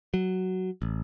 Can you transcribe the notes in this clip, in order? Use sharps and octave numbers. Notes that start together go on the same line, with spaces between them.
F#3
A1